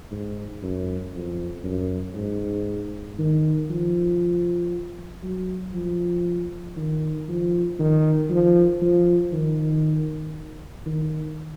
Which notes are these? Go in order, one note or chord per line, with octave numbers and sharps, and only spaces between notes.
G#2
F#2
F2
F#2
G#2
D#3
F3
F#3
F3
D#3
F3
D#3
F3
F3
D#3
D#3